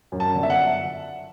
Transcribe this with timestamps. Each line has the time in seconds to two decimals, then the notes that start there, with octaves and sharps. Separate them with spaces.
0.12 F#2
0.20 A5
0.34 G1
0.43 E5
0.50 F#5